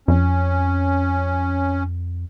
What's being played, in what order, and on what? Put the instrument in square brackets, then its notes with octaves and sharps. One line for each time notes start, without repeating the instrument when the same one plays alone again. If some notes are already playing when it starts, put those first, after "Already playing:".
[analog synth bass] F2 [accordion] C#4